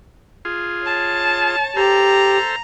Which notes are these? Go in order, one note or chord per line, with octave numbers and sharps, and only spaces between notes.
F4 G#4
C#5 A5
G4 A4 C5 A#5